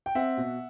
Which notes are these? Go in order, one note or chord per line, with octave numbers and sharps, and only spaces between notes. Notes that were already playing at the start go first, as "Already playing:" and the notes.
G5
C4 E5 F#5
B2